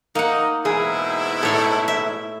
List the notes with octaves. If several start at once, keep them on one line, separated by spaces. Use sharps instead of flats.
A#3 D#4 F#5
G#2 B2 E3 E4 G#4
A2 A4 C#5 C6
E5